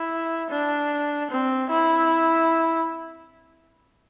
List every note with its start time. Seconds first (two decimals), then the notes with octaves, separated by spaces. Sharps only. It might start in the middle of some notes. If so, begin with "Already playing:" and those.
Already playing: E4
0.50 D4
1.30 C4
1.70 E4